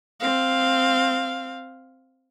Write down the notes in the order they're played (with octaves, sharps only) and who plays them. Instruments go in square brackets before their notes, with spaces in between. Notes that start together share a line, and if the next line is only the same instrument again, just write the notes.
[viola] C4 F5